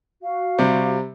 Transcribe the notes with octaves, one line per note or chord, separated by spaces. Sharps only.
F#4 F5
C3 G3